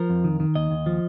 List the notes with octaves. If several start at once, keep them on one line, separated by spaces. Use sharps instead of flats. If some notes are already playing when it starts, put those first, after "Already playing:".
Already playing: F3 A#4
F2
D#3
D#3
D#2 D#5
D#2
F3